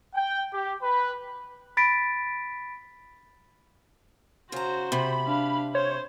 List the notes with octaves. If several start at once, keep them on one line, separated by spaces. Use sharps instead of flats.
G5
G4
B4
B5 A6 B6 D7
C#3 F#4 C5 A#5
C3 B5
D4 F5
C5 C#5